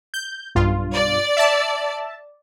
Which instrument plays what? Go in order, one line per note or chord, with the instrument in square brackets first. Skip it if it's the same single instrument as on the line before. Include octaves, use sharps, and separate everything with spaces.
[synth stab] G6
B1 G2 F4
[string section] D5
[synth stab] E5 A5